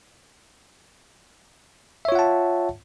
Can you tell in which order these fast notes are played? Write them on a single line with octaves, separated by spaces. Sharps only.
E5 C#5 F4 F#5 A5